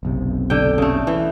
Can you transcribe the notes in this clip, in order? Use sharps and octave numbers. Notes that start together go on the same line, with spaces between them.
F#1 B1 C3
D3 G5
C#3 A3
E3